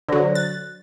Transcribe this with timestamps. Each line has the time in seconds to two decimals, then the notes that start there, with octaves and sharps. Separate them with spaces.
0.09 D3 F#3 C5 D5 A#6
0.35 F#6 A6